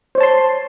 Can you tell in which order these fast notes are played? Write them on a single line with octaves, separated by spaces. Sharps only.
C5 C#5 A5 C6